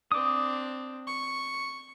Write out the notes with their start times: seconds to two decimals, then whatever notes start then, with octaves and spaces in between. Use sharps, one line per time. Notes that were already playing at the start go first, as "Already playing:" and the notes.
0.12 C4 D4 D6 D#6
1.07 C#6